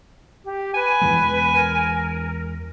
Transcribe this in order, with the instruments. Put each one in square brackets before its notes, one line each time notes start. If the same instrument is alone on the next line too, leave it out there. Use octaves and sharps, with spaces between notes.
[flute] G4
[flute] B4 [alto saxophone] G#5
[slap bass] E2 E3 G#3
[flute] A#4